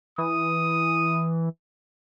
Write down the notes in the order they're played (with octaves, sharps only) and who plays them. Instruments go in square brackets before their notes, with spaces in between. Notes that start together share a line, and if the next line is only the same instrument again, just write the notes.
[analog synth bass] E3 [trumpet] D#6